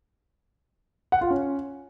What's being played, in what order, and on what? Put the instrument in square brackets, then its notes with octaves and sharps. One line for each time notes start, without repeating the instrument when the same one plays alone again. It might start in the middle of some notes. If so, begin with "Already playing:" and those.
[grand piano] F#5
F4
C#4